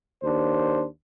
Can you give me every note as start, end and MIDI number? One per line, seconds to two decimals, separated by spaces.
0.23 0.85 39
0.23 0.85 62
0.23 0.85 72